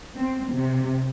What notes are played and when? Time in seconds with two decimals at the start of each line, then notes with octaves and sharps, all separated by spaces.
0.16 C4
0.52 C3